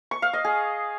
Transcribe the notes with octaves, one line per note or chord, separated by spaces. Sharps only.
C#6
F5
D#5
G#4